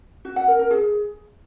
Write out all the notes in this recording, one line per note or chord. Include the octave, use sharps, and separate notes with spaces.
F#4
F#5
A#4
A#4
G#4